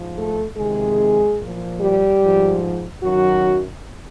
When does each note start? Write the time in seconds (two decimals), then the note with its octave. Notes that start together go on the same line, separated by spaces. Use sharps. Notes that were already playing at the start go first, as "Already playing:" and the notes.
Already playing: G#2 F3
0.15 A3 A4
0.56 F2 C3 D#3 G#3 G#4
1.38 A#2 F3
1.79 G3 G4
2.21 G#2 F3
3.02 F#2 D#3 F#3 F#4